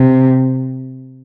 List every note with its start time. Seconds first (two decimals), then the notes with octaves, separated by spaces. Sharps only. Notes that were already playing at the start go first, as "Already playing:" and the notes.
Already playing: C3